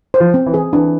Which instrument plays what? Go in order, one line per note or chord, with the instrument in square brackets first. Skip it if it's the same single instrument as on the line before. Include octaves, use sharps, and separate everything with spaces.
[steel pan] C5
[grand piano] F3
[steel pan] C4
[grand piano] E3
[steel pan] G#4
[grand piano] E3 [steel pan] D4